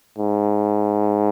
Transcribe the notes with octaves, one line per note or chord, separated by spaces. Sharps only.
G#2